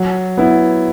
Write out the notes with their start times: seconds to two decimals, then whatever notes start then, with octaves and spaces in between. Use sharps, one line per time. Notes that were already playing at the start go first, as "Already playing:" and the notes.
Already playing: F#3
0.37 B3 E4